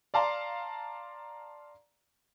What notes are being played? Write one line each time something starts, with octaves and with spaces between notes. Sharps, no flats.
D5 F5 A5 A#5 C6